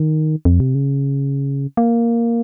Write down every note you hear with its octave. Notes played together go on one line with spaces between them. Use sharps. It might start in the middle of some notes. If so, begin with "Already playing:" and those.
Already playing: D#3
F2
C3
C#3
A#3